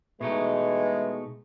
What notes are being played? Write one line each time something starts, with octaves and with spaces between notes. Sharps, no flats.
B2 E3 G#3 A3 D#4